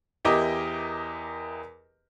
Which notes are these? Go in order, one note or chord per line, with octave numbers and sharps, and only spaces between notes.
E2 E4 G4 A#4 D#5 D6